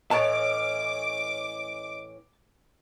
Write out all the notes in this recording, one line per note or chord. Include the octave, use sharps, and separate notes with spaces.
A2 E3 C#4 D#5 A5 D6